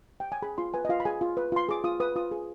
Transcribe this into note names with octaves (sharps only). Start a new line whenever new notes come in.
G5
G#5
G#4 B5
F4 C6
B4 G#5
D#5
F4 F5
B5
G#4 G#5
F4
B4
F4 C6
G#4 D6
F4 D#6
B4 D#6
F4 D#6
G#4